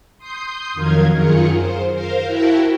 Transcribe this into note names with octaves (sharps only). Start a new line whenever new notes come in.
C6 D#6 G6 C7
F2 D#3 F#3 A#4 F5 G#6
F#2 D#3 F4 G#4 A#4 C#7
C5
A#4 C5 F5
E4 F#4 A#4 E5 G5 A5